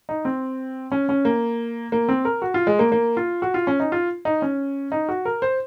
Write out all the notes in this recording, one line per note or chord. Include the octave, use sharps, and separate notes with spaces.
D#4
C4
C#4
C#4
A#3
A#3
C4
A#4
F#4
F4
G#3
A#3
A#3
F4
F#4
F4
C#4
D#4
F4
D#4
C#4
D#4
F#4
A#4
C5